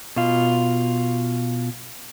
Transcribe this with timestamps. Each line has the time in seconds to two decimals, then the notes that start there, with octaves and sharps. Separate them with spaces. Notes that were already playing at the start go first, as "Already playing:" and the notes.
0.16 B2 F4